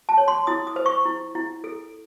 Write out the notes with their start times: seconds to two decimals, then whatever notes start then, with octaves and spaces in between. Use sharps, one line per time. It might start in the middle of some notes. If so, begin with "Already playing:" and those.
0.09 A5
0.18 C#5
0.28 C6
0.47 E4 D#6
0.67 D#6
0.76 C5
0.86 C#6
1.06 E4
1.35 E4
1.64 A4